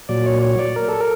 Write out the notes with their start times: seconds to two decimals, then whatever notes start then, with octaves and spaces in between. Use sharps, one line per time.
0.09 A#2 F#3 D5
0.26 C#5
0.43 C#5
0.59 D5
0.76 A#4
0.88 A4
1.00 A#4